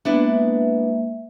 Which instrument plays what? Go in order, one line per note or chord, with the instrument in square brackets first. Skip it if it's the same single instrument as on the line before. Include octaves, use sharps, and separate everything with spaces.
[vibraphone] G#3 A#3 E5 [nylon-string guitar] B3 D4 E4